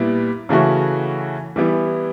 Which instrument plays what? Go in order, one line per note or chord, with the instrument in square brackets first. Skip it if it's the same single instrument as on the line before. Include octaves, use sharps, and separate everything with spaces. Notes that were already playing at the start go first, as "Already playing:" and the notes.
Already playing: [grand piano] A#2 G3 B3 E4
C#3 E3 A3 C#4 F#4
E3 G3 B3 E4